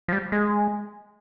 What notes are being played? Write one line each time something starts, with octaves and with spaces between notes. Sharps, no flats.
F3
G3
G#3